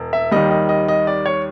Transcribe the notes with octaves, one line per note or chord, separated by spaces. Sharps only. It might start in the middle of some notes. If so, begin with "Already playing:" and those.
Already playing: E1
E5
D#2 D#3 G3 D#5
D#5
D#5
D#5
D5
C#5